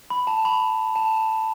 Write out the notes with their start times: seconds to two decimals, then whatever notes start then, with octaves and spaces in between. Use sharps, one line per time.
0.10 B5
0.27 A5
0.45 B5
0.96 A5